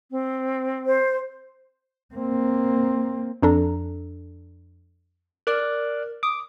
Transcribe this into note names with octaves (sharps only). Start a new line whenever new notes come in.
C4
C5
A#3 C4
F2 D4 A4 A#5
A#4 D5 D6 F#6
D6 D#6